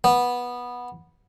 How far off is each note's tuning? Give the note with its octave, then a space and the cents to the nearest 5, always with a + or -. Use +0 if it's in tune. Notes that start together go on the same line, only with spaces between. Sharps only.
B3 -10